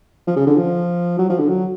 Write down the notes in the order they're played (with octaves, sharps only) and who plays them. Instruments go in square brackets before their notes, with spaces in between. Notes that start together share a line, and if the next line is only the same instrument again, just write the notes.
[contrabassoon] F3
C#3
D3
F3
F#3
F3
D3
F#3